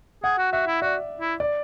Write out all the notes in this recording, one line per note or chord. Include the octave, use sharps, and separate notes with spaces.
G#4 F#5
F#4
F#4 E5
E4
F#4 D5
E4
D5